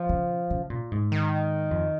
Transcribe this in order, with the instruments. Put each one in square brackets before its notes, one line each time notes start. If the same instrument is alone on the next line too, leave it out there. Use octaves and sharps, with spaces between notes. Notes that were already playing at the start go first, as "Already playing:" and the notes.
Already playing: [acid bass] F3
[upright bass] C#3
C#3
A#2
G#2
[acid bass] D#3
[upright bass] F2